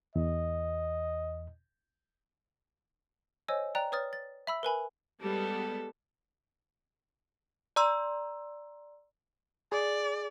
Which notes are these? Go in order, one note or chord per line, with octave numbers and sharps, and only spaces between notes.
E2 D#5
C5 C#5 D#5 G#5 E6
D5 G5 A#5 F#6
B4 C#5 D#6 F6 A6
A6
E5 B5 E6
A#4 B4 G#5 B5
G3 G#3 B3 A4
D5 A#5 C6 E6
G#4 D5